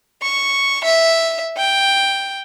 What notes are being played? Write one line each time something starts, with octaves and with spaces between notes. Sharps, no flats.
C#6
E5
G5